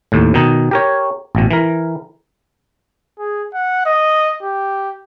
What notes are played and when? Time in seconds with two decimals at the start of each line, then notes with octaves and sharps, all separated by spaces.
0.12 D#2 A2
0.34 B2 D#3 D#4
0.71 G4 A#4 C#5
1.35 A1 B2
1.51 E3 A#4
3.19 G#4
3.54 F#5
3.86 D#5
4.43 G4